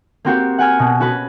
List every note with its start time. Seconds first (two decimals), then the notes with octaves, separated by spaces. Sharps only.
0.25 A#3 C4 F#4 G4
0.59 F#5 G#5 F6
0.79 B2
1.00 C#4 F#4 B4